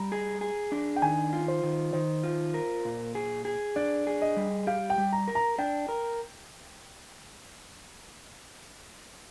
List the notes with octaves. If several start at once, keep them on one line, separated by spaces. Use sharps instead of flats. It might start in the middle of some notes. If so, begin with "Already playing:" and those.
Already playing: G3 A#5
G#4
G#4
D4
G5
D#3 G#5
F4
C5
D#3
D#3 C5
F4
A#4
A#2
G#4
G#4
D4 D5
G#4
D#5
G3
G4 F5
G5
G3
A#5
A#4
A#5
D4 G5
A#4